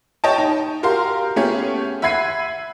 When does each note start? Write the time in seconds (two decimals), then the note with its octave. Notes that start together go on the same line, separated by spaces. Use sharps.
0.24 C#5 D#5 G5 A5
0.38 D#4
0.83 F#4 G4 A#4 F5 C6
1.36 A3 B3 C#4 G4 G#4
2.02 E5 F#5 B5 G#6 C7 D#7